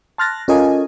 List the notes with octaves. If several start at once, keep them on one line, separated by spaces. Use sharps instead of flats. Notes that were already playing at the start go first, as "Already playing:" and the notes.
A5 C6 F6 F#6 A6 A#6
C#4 F4 A4 A#4 D#5 G#5